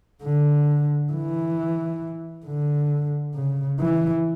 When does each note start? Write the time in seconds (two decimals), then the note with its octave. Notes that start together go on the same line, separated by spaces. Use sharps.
0.23 D3
1.12 E3
2.46 D3
3.35 C#3
3.80 E3